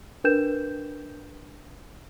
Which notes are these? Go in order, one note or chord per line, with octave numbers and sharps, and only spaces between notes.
D4 A#4 B4 G5 G6 E7